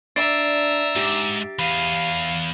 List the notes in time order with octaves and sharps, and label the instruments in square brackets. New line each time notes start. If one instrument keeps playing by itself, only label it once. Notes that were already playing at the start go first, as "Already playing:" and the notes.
[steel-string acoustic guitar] D4 [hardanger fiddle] E5 A#5 [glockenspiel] A6 C7 D7
[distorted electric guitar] G#2 [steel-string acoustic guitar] G4
[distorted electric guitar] E2 [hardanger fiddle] F5 [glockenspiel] B5 D#7